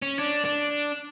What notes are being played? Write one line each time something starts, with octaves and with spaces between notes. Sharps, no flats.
C#4
D4
D4